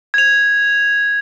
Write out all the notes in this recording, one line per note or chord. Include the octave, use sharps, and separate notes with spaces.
G#6 F7